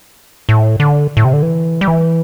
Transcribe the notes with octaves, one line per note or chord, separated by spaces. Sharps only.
A2
D3
A2
C3
D3
E3
G3
E3